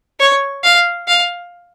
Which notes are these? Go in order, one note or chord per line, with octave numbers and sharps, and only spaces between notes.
C#5
F5
F5